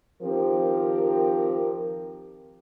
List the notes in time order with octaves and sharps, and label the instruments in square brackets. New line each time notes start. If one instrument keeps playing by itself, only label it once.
[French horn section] D#3 F3 C4 G4 A#4